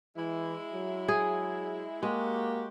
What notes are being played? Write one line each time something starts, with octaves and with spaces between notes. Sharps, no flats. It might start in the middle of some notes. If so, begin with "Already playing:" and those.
E3 G#3 E4
F#3
G#4
G#3 A#3 F#4 G4